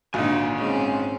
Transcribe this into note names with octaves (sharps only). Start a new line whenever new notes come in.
G#1 A#2 D3 D#4 F5 G#5
G#2 C4 C#4